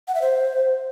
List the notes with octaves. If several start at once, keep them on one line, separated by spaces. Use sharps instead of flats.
F#5
E5
C5